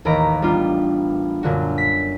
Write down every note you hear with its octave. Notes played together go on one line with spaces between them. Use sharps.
A1 D#2 D#3 A#5 B5 D7
G3 B3 D4 F4
F#2 A#2 D3 F#4
B6